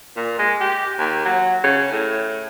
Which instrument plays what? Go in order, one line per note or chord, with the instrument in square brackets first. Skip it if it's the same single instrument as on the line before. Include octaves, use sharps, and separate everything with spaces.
[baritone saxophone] A#2
G#3
G4
D#2
F#3
C#3
A2